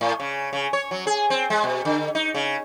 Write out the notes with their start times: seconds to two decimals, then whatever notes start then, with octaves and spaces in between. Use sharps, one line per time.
0.01 A2
0.20 C#3
0.53 C#3
0.73 C#5
0.91 F#3
1.07 G#4
1.30 C4
1.50 G#3
1.64 B2
1.85 D3
2.15 D#4
2.34 C#3